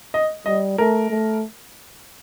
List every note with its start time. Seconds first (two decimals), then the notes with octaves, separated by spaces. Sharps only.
0.14 D#5
0.46 G3 D#5
0.78 A3 A#4
1.10 A3